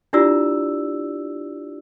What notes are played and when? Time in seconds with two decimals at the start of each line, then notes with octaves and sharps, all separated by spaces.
0.13 D4 E4 F4 G4 D5 E6